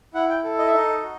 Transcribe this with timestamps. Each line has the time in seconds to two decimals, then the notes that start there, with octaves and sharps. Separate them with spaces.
0.14 E4 F#5
0.29 G5
0.44 A4
0.58 D#5
0.67 E5
0.73 D#4 D#5
1.02 F#4